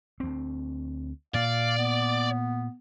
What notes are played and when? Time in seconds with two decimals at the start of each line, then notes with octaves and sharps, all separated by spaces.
0.20 D2 C4
1.34 A#2 D5 F5
1.78 B3